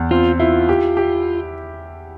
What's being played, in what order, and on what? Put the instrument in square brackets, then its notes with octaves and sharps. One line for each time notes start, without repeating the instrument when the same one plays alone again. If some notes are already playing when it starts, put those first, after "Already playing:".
Already playing: [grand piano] E2
[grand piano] C4 [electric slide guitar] F4
[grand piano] E4 [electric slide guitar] F4
[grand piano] G4
G4